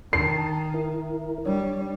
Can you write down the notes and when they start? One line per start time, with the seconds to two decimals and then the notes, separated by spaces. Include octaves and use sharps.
0.13 D#3 A5 C7
0.74 E4 A#4
1.46 G3 D4 C#5